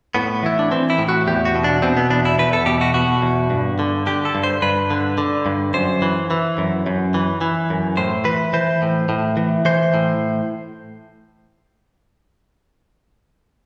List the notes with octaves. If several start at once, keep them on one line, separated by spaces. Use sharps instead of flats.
A2 B3
E3 E4
D4
E3 C4
E4
A2
F#4
E2 G4
F#4
B2
D4
B2 C4
B3
E2 D4
E4
E2 B4
A4
B2 G4
F#4
B2 F#4
E2
G2
D3
D3 G4
A4
G2
C5
G2 B4
D3
D3
G2
F#2 C5
E3
E3
F#2
F#2
E3
E3
F#2
A2 C5
E3 B4
E3 C5
A2
A2
E3
E3 C5
A2